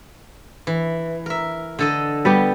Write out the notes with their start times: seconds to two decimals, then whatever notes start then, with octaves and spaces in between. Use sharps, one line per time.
0.67 E3
1.26 A#4 E5
1.79 D3 A4 D#5
2.25 G3 B3 G4